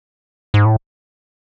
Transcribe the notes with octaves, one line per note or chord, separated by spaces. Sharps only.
G#2
A2